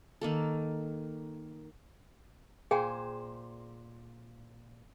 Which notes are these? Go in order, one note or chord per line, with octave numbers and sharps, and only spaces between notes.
D#3 A#3 A4
A#2 G#4 C5 G5 G#5